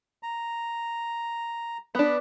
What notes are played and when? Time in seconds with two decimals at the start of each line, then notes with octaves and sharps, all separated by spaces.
0.23 A#5
1.95 B3 D4 B5